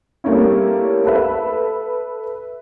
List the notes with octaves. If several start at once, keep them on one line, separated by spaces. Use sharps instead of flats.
G3 A3 A#3 C4 C#4 E4
A4 B4 E5